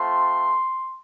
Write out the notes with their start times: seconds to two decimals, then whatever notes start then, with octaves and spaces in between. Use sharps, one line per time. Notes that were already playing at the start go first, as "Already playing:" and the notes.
Already playing: A3 C4 F4 C6